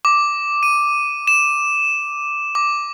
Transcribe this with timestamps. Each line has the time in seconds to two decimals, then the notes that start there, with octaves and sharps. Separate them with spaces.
0.05 D6
0.63 D#7
1.27 E7
2.55 D6